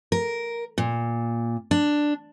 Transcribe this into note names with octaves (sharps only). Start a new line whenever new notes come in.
A#4
A#2
D4